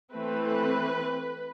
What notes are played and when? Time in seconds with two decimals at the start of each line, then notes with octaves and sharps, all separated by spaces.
0.12 E3 A3 C4 B4